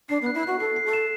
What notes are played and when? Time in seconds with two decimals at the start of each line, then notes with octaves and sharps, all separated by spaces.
0.09 D4 C7
0.22 B3
0.26 F#6
0.34 E4
0.43 F#4 F#6
0.60 A4 C7
0.76 C7
0.85 A4
0.93 E7